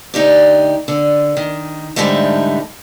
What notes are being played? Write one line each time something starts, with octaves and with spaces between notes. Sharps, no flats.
D2 D#4 G4 D5
D3
D#3
G#2 D3 E3 G3 A3 D#4